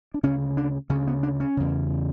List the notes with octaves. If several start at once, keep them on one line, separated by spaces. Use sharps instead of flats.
D4
D2 C#3 C#4
D4
D2 C#3 C#4
B3
D4
C#4
E2 C#3